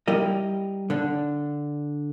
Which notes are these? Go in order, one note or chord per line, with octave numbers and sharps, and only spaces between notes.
G3 E4 A#4 D#5
D3 D4